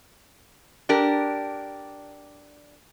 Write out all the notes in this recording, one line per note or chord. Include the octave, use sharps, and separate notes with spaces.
D4 G4 A#4